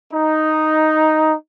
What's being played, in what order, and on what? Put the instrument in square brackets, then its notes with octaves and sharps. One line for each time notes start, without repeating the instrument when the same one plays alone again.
[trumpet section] D#4